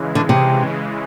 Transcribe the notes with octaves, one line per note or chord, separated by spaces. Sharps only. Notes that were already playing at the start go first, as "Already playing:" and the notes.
Already playing: C#3 E3 G#3
D3
C3